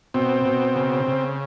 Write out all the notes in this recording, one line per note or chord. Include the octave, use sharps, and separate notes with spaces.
B2 C4
B2
C#3
C#3